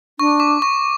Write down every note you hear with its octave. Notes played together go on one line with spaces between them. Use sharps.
D4 C#6
D6
C#6